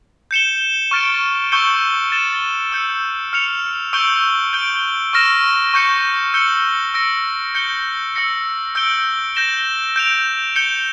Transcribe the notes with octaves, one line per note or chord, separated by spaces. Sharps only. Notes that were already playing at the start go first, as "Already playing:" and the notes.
G6 C#7 E7 G7
C#6 F6 A6 D7
C#6 E6 G6 C#7 G7
A6 E7 G7
E6 G6 C#7
F6 C#7 F7
C#6 E6 G6 D7 G7
G6 D7 G7
C#6 F6 A#6 E7
C#6 G6 C#7
E6 G6 C#7 G7
E6 A#6 D7
G6 C#7 G7
E6 A#6 C#7
E6 G6 D7 G7
G6 A#6 E7 G7
G6 D7 F7
G6 C#7 G7